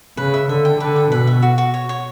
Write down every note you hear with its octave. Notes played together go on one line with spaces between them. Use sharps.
C#3 B4
E5
D3 E5
G5
D3 B4
G5
B2 B4
E5
F#4
F#4
C#5
C#5